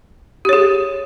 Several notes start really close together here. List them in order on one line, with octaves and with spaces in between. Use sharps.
G4 C#5 G#4